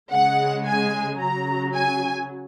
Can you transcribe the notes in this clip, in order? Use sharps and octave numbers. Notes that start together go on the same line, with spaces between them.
C#3 G#3 F#5
G#5
C#3 F#3 A#5
G#5